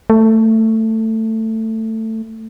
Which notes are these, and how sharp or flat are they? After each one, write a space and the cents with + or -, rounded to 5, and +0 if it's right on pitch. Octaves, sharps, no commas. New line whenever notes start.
A3 +15